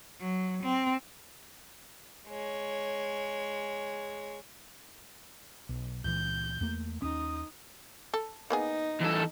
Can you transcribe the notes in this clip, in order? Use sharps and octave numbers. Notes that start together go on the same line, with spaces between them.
F#3
C4
G#3 C#5
B1
C#2 A#2 E3 G6
E2 A3 A#3
D#2 C#4 D#4 D#6
A4
A#3 B3 D#4 G#4
E2 A4